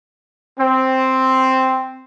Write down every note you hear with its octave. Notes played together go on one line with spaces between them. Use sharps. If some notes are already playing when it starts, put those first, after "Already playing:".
C4